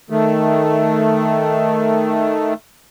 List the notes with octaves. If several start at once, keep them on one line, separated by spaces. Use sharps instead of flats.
D#3 A3